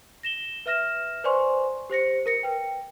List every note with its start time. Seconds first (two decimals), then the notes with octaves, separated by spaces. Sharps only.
0.23 A#6 E7 G7
0.66 B4 E5 F6 A#6 E7
1.24 B4 C5 D5 G#5 C6 C#6
1.90 G4 C5 A#6 C#7
2.26 A#4 A#6 C#7
2.43 B4 G5